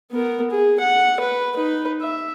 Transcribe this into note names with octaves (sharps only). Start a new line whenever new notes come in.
B3 A#4
G#4
F#5
B4
D#4 B4
E5